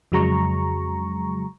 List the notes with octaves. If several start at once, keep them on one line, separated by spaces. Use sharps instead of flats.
F2 C#3 F#3 G#3 A#5 C#6